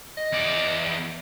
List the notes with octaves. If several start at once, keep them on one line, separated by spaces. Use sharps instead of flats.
D#5
E2 D5